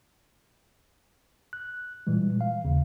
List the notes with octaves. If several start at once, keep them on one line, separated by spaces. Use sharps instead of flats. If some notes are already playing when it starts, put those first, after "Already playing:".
F#6
A#2 E3 G3 G#3
F5
D#2 C#3